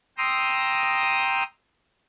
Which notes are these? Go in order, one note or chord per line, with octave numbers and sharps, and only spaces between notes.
G5 A#5 C6 D#6 E6